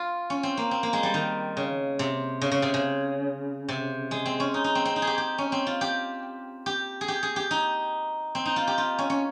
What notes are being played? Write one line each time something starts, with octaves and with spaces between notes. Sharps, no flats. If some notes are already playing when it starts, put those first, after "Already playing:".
Already playing: F4
C#4
C4
A#3
C4
A#3
G#3
G3
D#3
C#3
C3
C#3
C#3
C3
C#3
C3
G#3
C4
C#4
D#4
D#4
C4
C4
D#4
G#4
G4
G4
C#4
C4
F4
G4
G4
G#4
G4
G#4
G4
D#4
C4
D#4
F4
G4
F4
C#4
C#4